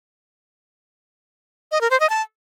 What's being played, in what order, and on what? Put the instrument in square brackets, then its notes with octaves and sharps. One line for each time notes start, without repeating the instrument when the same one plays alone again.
[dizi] D#5
A#4
C5
D#5
A5